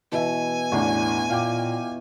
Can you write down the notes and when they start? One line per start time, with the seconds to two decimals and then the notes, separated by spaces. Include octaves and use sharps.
0.12 B2 E3 E5 G#5
0.72 A1 E2 E3 D4 C#6
1.30 A#2 F5 G5 D6